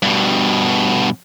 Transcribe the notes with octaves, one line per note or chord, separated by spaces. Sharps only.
G2 B2